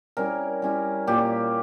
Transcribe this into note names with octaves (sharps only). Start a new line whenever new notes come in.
G3 C#4 E4 A#4
G3 C#4 E4
A#2 G3 A#3 G4